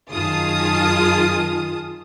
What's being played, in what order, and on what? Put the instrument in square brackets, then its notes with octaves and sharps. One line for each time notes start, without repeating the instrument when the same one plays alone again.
[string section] F#2 D#3 F4 G#4 A5 D#6